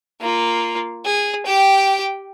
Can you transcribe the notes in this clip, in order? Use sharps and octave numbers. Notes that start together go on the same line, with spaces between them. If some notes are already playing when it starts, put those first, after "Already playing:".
A#3 F4
G#4
G4 G5